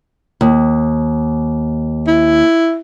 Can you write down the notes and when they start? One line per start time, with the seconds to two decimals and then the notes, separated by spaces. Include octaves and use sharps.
0.41 D#2
2.07 E4